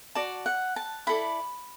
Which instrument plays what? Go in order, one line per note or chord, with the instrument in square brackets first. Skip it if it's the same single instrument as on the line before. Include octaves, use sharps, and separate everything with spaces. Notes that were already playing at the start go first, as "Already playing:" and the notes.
[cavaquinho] F#4 D5 A5
F#5
A5
E4 A4 D5 B5